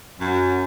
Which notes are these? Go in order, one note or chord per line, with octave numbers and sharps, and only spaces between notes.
F#2